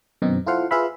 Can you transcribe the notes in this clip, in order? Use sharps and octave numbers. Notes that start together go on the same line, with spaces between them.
F#2 B2 D#3 C4 D#4
E4 F4 A4 C5 F5 F#5
F4 G#4 B4 E5 F5 B5